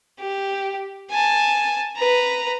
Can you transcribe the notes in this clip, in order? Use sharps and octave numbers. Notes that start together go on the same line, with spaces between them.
G4
G#5 A5
B4 A#5